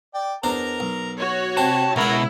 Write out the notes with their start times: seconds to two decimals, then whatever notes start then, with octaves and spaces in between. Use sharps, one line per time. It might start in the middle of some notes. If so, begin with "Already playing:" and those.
0.15 D5 G5
0.44 E2 D4 A#4 C5 A#5
0.80 B1
1.18 F#4 C#5
1.57 C3 G4 C5 A5
1.96 C#2 B2 E4 F#4 A#4 C#5 F#5 B5